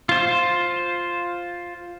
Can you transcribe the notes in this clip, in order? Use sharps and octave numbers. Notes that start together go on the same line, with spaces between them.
F4 C5